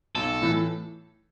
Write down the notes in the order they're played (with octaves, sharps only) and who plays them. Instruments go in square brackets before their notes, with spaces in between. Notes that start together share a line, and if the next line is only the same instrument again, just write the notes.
[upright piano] B1 [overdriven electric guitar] A4
[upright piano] A2 E3